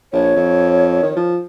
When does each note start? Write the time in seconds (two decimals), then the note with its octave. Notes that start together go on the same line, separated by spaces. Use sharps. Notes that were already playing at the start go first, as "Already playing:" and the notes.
0.13 A#1 C#5
0.36 F2
1.03 D#3
1.16 F3